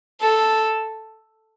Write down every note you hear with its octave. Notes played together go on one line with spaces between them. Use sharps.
A4